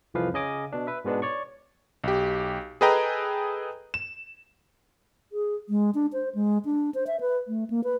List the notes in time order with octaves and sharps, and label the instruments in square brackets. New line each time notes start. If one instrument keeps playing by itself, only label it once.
[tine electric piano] C2 F2 E3 F3 B4 F5
C#3 C#4 D#5 G#5 D6 D#6
B2 D4
B4 E5
G#2 B2 G#3 B3 D4
C#5 D5 C#6
[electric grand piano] B1 G4
G#4 A4 B4 D#5 G5 A#5
E7
[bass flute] G#4
G#3
D4
C5
G#3
D4
C5
E5
B4
A3
A#3
B4